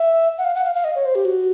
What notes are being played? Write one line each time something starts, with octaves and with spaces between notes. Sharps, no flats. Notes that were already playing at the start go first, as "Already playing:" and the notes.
Already playing: E5
F#5
F5
F#5
F5
F5
D#5
C#5
C5
G4
F#4